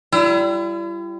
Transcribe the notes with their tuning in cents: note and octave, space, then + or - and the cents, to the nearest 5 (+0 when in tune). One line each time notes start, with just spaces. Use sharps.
G3 -15 E4 +40